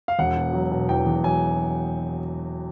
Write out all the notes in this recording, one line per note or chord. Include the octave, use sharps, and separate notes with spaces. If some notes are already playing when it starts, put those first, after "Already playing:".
F5
E1 F#5
B2
F#3
B2
E2 G5
E2
F#3 G#5